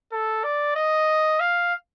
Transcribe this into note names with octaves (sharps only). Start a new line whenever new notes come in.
A4
D5
D#5
F5